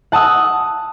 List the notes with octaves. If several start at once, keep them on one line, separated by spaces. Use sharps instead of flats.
F#5 A5 D#6 E6